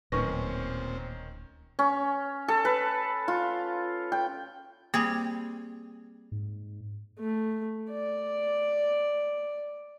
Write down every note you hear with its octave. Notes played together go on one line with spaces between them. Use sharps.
D1 A#2 D#3 C4 C#4 B4 C#6 A#6
C#4
A4
B4
F4
G5
G3 A#3 C4 G#4
G#2
A3
D5